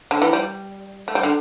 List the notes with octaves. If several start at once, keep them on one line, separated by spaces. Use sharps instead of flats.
D3
E3
G3
A3
G3
D3